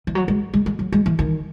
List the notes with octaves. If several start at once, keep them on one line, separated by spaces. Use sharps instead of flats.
E3
F#3
G#3
G#3
G#3
F#3
G#3
E3
D#3